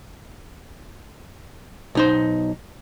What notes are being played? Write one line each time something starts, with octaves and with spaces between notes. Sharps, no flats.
B1 D#4 C5